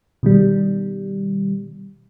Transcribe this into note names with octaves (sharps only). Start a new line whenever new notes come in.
B2 D#3 G3